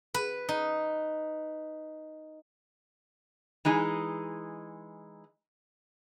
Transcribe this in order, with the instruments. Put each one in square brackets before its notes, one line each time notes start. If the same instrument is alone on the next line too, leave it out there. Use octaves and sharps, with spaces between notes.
[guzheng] B4
D#4
[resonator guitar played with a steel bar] E3 G#3 D#4 G#4